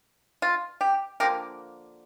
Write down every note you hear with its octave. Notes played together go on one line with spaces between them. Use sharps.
F4
G4
D3 F3 A#3 G4 A#4